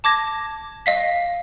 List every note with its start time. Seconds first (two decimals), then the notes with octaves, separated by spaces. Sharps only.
0.04 A5 D6 G#6 A#6
0.86 D#5 F5 B6